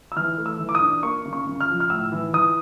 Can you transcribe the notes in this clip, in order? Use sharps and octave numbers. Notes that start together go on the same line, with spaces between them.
E6
E3 F6
A3
E6
E3
D6
D#6
D4
A#3 C#6
C#3
C#6
C#3
F6
F3
F6
A2 E6
E3
E3 D#6